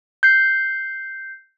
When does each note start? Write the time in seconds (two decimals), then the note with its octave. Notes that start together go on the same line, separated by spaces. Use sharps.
0.23 G6 C7